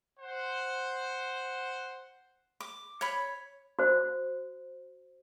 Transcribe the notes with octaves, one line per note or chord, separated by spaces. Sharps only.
C5 F#5
D6
C#5 B5
F#4 C5